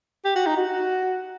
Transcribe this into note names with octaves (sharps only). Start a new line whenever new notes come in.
G4
F#4
D#4
F#4